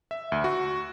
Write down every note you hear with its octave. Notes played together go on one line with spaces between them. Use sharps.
E5
D2
F#4